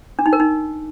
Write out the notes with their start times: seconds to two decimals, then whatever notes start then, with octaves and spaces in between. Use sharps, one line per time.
0.19 D4
0.26 D#4
0.33 A#4
0.40 D#4